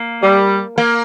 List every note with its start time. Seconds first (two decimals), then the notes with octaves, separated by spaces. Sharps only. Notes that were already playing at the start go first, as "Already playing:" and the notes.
Already playing: A#3
0.22 G3
0.78 A#3